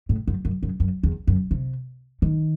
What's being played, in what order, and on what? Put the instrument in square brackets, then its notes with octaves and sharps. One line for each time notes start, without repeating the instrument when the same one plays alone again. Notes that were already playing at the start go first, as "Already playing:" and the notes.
[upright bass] A2
F#2
F#2
F#2
F#2
E2
F#2
C3
D#3